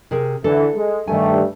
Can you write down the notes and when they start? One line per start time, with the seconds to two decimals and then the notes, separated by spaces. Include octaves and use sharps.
0.11 C3 G#4 A#4
0.44 D3 E3 A4
0.75 G#3
1.08 G2 D#3 G3 A3 G#5